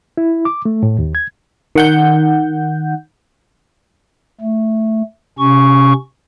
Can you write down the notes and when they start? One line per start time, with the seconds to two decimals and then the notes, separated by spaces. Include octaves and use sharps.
0.17 E4
0.45 D6
0.65 A3
0.83 A2
0.99 D#2
1.15 G#6
1.75 D#3 F#5 G6
4.41 A3
5.39 C3 C#4 C#6